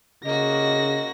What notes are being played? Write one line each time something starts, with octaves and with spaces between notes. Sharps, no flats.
C#3 A#3 F#4 D#5 A#6